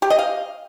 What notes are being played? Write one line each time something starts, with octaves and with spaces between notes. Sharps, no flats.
G4
D#5
F5